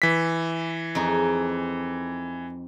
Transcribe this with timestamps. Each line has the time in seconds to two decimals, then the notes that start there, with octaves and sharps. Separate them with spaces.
0.02 E3 B6
0.95 F2 D#4 G#4